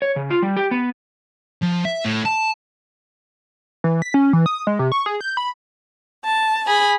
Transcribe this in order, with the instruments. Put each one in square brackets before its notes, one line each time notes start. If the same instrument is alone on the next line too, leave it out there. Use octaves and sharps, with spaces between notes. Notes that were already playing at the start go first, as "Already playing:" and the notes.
[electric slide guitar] C#5
C#3
F4
G3
G4
B3
[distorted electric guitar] F3
E5
A2
A5
[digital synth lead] E3
B6
C#4
E3
D#6
G#3
C3
C#6
G#4
G6
B5
[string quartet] A5
G#4 B5